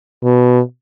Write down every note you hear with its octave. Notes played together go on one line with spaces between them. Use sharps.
B2